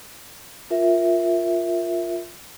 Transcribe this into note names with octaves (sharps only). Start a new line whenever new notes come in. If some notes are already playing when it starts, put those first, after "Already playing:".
F4 A#4 E5